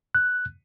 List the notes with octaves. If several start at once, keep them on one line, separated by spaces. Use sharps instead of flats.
F#6